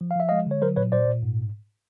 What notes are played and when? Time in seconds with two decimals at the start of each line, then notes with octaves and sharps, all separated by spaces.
0.01 F3
0.11 F5
0.16 F3 E5
0.29 G#3 D#5 F5
0.46 D3 C#5
0.62 F#3 A#4 C5
0.76 A#2 B4 C#5
0.92 A#2 C5 D5
1.08 A#2
1.22 G#2